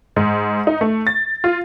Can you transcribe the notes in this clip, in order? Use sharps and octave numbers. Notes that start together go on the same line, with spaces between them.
G#2
D#4
A3
A6
F4